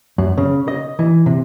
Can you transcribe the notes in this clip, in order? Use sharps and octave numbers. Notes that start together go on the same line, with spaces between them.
F#2
C#3
D#5
E3
C3